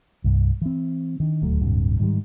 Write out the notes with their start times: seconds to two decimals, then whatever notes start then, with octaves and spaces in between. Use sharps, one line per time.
0.24 C2 G2
0.62 E3 C4
1.20 D#3 D4
1.42 D#1 D2 F#3 A3
1.62 D1 G2 C3
1.99 G#2 D#3 F#3 G3